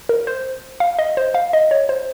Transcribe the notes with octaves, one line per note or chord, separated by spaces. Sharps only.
A#4
C5
F5
D#5
C5
F5
D#5
C#5
C5